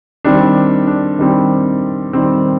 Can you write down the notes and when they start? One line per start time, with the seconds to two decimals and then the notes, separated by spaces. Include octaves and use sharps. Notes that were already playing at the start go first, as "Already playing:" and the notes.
0.24 D#3 G3 C4 D4
0.87 D4
1.19 D#3 G3 C4
2.13 D#3 G3 C4